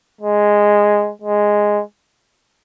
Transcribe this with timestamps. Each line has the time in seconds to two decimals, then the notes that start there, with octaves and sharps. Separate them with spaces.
0.21 G#3
1.22 G#3